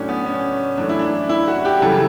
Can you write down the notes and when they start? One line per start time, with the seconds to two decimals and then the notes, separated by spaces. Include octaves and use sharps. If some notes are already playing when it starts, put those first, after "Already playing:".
Already playing: A2 F#3 A3 C#4 D4
0.09 B3
0.26 C#4
0.77 F#2 E3 A3 D4
0.89 E4
0.99 D4
1.29 E4
1.48 F#4
1.65 G4
1.82 F#2 C#3 E3 G3 A4